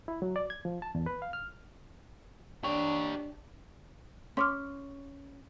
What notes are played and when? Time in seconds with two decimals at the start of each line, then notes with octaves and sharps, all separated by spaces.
0.08 E4
0.22 F#3
0.36 D5
0.50 G#6
0.65 F3
0.82 A5
0.95 E2
1.06 B4
1.22 F5
1.33 F6
2.64 D4 G4 C#5
4.37 C#4 C6 D6 F6